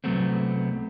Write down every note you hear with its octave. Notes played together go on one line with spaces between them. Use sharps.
C2 F#3 A3 B3 C4